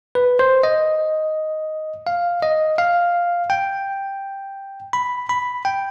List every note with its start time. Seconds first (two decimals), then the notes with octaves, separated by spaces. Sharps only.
0.15 B4
0.39 C5
0.63 D#5
2.07 F5
2.42 D#5
2.78 F5
3.50 G5
4.93 B5
5.29 B5
5.65 G5